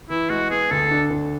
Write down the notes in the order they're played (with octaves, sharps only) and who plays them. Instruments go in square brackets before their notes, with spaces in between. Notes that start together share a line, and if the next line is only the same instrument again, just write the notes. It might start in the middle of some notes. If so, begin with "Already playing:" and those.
[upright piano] E3 [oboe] E4
[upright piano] G#3 [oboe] F#4
[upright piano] B3 [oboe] G#4
[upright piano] D2 [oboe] A4
[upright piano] D4
D2